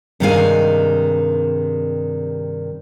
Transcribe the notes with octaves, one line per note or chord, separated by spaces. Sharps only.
G2 C3 D#3 G#3 F5 G#5